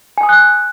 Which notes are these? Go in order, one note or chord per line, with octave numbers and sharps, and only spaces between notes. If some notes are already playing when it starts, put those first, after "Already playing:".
G#5
D#6
F#6